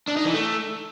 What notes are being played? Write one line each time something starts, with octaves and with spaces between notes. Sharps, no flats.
D4
D#4
E3
A3